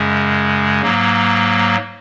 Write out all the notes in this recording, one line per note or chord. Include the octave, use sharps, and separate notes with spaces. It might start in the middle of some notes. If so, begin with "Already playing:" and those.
Already playing: F#2 C#3 G#3
G#2 F#3 A#3